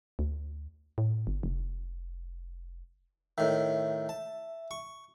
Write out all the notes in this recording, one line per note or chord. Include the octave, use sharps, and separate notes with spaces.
D2
A2
G1
F1
A2 D#3 E5
A5
C#6